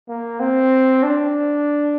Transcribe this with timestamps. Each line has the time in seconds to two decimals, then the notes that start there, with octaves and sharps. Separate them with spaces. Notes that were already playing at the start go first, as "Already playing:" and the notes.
0.08 A#3
0.40 C4
1.03 D4